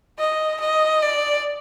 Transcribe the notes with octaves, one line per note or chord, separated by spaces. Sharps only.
D#5
D#5
D5